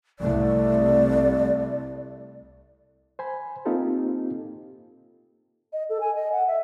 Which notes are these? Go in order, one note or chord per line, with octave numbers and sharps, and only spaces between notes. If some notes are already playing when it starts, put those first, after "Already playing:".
C2 A3 D5
C5 G#5 B5
A#3 C4 D#4 F4 G4 A4
D#5
A4
G#5
D#5
F#5
E5